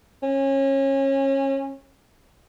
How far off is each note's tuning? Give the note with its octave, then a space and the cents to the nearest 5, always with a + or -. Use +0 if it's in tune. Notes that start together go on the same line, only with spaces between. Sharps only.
C#4 -25